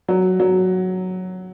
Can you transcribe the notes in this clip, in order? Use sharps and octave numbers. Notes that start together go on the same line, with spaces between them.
F#3
F#3